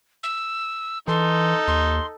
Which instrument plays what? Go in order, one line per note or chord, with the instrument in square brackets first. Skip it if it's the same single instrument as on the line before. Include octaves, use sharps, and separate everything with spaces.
[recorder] E6
[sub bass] E3 [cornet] D#4 [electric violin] A4 [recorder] C6
[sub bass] D#2 [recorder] C6